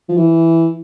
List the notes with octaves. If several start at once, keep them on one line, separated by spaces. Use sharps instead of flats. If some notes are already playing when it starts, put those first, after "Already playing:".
F3
E3